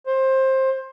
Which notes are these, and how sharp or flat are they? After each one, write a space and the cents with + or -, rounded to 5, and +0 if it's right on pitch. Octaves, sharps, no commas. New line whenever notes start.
C5 +20